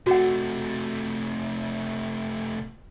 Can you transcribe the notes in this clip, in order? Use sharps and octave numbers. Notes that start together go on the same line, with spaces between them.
C3 A3 F#4 F#5